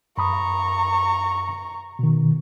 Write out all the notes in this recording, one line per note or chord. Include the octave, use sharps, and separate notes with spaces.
F#2 A#5 B5 C#6 D#6
B2 D#3